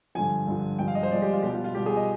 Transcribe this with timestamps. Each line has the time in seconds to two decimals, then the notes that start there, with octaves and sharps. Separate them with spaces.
0.15 G2 D3 F3 G#5
0.47 G2 D3 F3
0.79 G2 F3 G#3 G5
0.88 F5
0.95 D#5
1.03 C5
1.11 G2 F3 G#3 D5
1.22 G4
1.33 F4
1.43 B2 G3 G4
1.54 F4
1.64 F4
1.75 B2 G3 G4
1.86 G#4
1.96 D#5